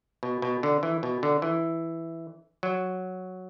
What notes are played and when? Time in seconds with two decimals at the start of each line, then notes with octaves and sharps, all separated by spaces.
0.23 B2
0.42 B2
0.63 D3
0.83 E3
1.03 B2
1.23 D3
1.42 E3
2.63 F#3